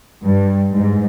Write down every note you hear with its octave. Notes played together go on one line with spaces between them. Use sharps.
G2
G#2